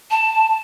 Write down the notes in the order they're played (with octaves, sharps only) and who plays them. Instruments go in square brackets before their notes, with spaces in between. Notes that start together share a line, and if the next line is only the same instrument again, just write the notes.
[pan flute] A5